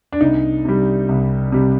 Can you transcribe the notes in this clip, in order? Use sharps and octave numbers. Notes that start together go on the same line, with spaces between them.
D4
C2 D#4
C3 G3
C2
C3 G3